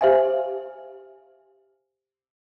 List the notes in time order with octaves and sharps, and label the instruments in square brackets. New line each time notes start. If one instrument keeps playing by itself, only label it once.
[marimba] G4 C5 E5 F5 G#5